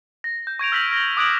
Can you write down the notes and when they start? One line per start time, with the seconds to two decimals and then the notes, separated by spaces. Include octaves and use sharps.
0.24 A#6
0.47 G6
0.59 C#6 G#6 D7 F7
0.72 E6 F6 A#6 B6 F7 F#7
0.91 F6 A#6 G7
1.17 D6 D#6 F#6 G#6 D7 F#7